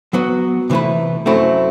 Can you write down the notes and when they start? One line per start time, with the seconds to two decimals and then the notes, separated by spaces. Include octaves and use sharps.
0.13 F#3 B3 F#4
0.70 C3 E3 A3 E4 B4
1.26 F#2 F#3 A3 C4 E4